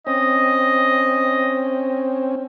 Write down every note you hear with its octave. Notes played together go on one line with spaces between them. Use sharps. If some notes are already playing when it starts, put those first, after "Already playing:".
C4 C#4 D#5